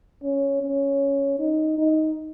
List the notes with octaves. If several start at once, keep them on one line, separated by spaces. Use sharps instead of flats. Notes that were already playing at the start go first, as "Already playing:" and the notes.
C#4
C#4
D#4
D#4